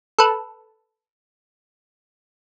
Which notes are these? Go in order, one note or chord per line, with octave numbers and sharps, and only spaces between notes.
A4 B4